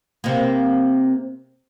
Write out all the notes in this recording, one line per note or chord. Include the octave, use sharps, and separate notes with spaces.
C3 A#3